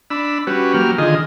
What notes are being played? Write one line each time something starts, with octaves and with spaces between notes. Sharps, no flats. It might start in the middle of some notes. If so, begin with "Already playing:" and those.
D4 B5 E6
G3 C#4 F#4 B4
F#3 A#3 G4 F6
D3 D#3 F4 G#4 D#5